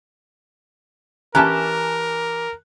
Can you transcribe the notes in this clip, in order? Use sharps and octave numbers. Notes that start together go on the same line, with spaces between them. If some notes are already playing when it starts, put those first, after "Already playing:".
E3 C#4 G4 A#4 A5 A#5 F#6